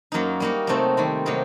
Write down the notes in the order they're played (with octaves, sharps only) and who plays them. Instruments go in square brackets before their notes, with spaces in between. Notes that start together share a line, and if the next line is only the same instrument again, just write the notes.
[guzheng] F#2 F#3 A#3 D#4
G3 A#3 D#4 F#4
C3 F#3 A3 C4 D#4
D#3 G3 C4
C3 F#3 A#3 D#4